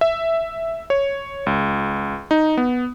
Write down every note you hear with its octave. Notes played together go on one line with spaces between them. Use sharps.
E5
C#5
C#2
D#4
B3